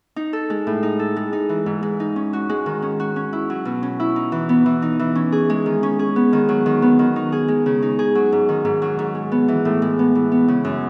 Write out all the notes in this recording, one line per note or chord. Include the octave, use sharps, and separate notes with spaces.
D#4
A4
G#3
A2
D#4
A4
G#3
D#4
E3
G#2
G#3
D#4
C#4
F#4
G#3
D#3
C#4
F#4
C#4
E4
F#3
B2
C#4
E4
D#4
E3
B3
E3
D#4
E3
C#4
G#4
G#3
D#3
C#4
G#4
B3
D#3
F#3
D#3
B3
D#3
D#4
G#4
G#3
C#3
D#4
G#4
F#3
G#2
D#3
G#2
F#3
G#2
G#3
B3
E3
A2
G#3
B3
E3
B3
C#3
F#2